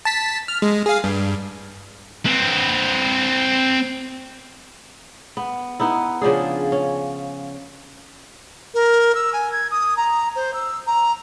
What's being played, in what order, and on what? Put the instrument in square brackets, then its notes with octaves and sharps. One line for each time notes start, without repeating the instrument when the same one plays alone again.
[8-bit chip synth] A5 B6
F6
G#3
G#4 F5
G2
[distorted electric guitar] C4 B4
[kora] B3
B3 D#4 E4
C#3 F3 D4 G#4
C#4
[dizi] A#4
E6
G#5
G#6
D#6
A#5
C5
E6
A#5